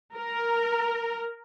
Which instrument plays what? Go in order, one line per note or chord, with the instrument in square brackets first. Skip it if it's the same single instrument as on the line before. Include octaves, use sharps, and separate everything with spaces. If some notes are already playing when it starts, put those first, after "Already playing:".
[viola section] A#4